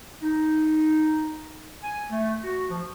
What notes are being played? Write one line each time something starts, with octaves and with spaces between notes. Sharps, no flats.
D#4
G#5
A3
F#4
F3